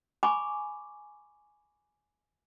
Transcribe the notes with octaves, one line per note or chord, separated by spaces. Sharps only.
G#5 B5 C#6 D6